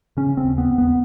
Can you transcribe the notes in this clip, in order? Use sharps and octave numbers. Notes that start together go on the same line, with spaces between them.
C#3 C#4
C4
D#2
B3
D#2
B3